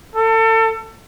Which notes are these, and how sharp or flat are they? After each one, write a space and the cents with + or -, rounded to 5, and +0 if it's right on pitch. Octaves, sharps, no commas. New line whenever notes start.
A4 +30